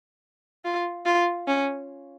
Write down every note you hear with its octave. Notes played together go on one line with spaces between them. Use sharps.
F4
F4
C#4